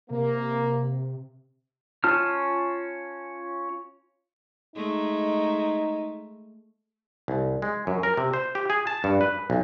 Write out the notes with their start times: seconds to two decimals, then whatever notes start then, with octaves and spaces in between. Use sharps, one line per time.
0.10 C3 A#3
2.04 C#4 F4 A5 F6
4.76 G#3 A3 D#4
7.28 C2
7.62 G#3
7.87 F#2
8.03 A#4
8.17 C3
8.33 C5
8.55 G4
8.70 G#4
8.87 A5
9.04 G2
9.21 B4
9.50 B1